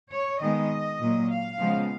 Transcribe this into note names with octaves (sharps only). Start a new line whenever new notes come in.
C#5
D#3 G#3 B3 D#5
A#2 F#3 A#3
F5
C#3 F3 G#3 B3